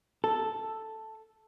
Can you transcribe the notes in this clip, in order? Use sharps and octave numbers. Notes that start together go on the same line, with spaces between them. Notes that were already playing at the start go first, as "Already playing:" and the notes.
A4